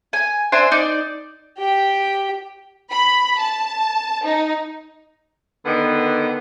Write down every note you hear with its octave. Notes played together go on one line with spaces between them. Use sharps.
G#5
D4 C5 E5 G#5
D#4 D5
G4 G5
B5
A5
D#4
D3 D#3 B3